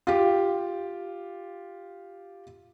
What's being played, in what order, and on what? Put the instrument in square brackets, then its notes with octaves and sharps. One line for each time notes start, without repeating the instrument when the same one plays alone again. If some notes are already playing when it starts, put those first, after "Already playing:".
[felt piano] F4 G4